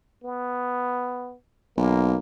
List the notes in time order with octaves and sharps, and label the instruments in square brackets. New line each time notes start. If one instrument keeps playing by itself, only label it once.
[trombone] B3
[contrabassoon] B1 [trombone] A#3